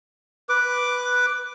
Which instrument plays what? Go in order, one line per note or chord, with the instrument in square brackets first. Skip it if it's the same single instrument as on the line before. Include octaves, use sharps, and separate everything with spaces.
[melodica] B4 D6